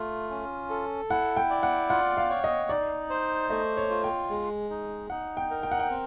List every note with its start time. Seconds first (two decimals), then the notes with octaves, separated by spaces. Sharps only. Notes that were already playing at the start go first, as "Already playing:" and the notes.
Already playing: A3 F4
0.30 C#4
0.70 A4
1.10 E4 F#5
1.37 G5
1.50 D5
1.63 F#5
1.90 F4 F#5
2.17 F5
2.30 C#5
2.44 D#5
2.69 D#4 D5
3.10 C5
3.50 A3 D#5
3.77 C#5
3.90 F4
4.04 G5
4.30 G#3
4.70 D#4
5.10 D#4 F#5
5.37 G5
5.51 A#4
5.63 G5
5.72 F#5
5.79 G5
5.90 C4